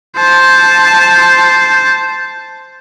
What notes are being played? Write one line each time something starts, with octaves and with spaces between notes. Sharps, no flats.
C5 A5